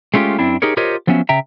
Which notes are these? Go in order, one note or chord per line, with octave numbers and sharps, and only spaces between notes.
G#3 A3 C#4 F4 G4
F#2 C4 D4 E4
D#4 G4 G#4 A#4 C#5
F4 G4 A#4 C5 C#5 D#5
F3 F#3 B3 C#4 E5
C#3 E5 G5 A#5